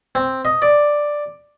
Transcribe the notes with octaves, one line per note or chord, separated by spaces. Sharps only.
C4
D#5
D5